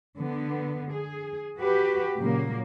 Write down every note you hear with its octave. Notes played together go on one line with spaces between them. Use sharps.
D3 B3
G#4
F#4 G4 B4
A#2 C#3 F#3 A#3